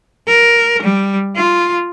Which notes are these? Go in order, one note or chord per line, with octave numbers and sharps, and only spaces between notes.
A#4
G3
F4